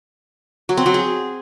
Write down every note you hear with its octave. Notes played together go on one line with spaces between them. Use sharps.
F#3
C4
F#3
G#4